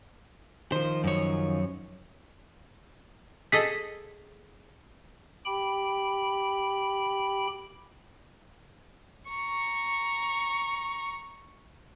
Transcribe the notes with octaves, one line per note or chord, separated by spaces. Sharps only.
D#3 F3 C5
F#2 C#5
G#4 A4 D#5 B6
G4 G5 B5
A#5 C#6